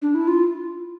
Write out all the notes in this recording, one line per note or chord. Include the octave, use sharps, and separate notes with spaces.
D4
E4
F4